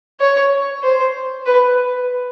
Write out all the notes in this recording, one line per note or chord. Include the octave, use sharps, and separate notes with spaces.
C#5
C5
B4